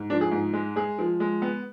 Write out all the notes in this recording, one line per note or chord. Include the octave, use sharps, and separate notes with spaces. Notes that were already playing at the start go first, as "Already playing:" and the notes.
Already playing: G#2
F3 D4
G#4
G#2
G#3
G#3 G#4
F3
G#3
B3